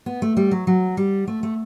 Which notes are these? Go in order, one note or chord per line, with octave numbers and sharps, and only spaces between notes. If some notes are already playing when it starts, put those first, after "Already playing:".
B3
A3
G3
F#3
F#3
G3
A3
A3